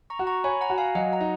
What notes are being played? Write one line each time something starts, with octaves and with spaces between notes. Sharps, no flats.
A#5 C#6
F#4
A#5 C#6
C#5 G#5 B5
F#5 A#5
F#4
F5 G#5
F#3 D#5 F#5
F#5 A#5
D#4